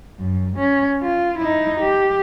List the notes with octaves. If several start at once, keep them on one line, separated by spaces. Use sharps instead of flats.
F#2
C#4
F4
D#4 E4
G4